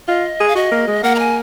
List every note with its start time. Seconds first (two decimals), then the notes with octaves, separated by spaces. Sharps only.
0.08 F4 D#5
0.40 G#4
0.48 F5
0.55 F#4 D#5
0.71 A#3
0.88 G#3
1.03 A#3 F#5
1.15 A#5
1.19 G#5